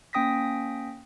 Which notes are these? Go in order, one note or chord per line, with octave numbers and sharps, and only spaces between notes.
A#3 C#4 G5 D#6 A#6 B6